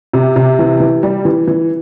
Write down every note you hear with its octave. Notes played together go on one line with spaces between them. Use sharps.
C3
C3
E3
E3
G3
E3
E3